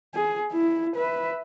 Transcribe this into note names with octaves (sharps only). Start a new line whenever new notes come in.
G#4
E4
B4 E5